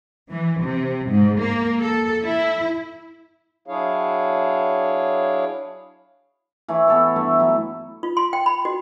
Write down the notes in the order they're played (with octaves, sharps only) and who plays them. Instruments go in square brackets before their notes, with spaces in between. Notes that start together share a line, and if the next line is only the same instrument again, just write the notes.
[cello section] E3
C3
G#2
A#3
A4
E4
[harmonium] F#3 D4 E4 G#4 C#5 F5
[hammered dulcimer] E3 A3 E4 C#5
B3 A4 C#5
G2 A3 E5
F#3
[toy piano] F4
C6
G5
B5
F#4